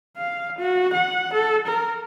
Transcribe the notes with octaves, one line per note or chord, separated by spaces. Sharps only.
F5
F#4
F#5
A4
A#4